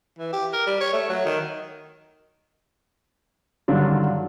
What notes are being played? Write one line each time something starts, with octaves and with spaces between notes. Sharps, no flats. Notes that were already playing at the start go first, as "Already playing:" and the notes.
E3
G4
A#4
G3
C#5
A3
F#3
D#3
G2 D3 D#3 F#3 D4 F4